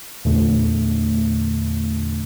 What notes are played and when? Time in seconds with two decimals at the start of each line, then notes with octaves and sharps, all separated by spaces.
0.25 E2 A#2 D3 A3